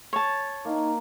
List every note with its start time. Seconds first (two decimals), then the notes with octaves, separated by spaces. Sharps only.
0.13 C#5 A5
0.65 A#3 D#4